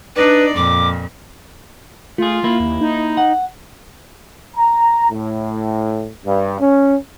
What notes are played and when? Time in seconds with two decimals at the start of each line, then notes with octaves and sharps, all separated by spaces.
0.16 D4 D#4 B4 D5
0.56 F2 A#2 D6
2.18 A3 F4 G#4
2.44 A#3 E4
2.60 D#2
2.81 D#4
3.17 F#5
4.56 A#5
5.11 A2
6.25 G2
6.60 C#4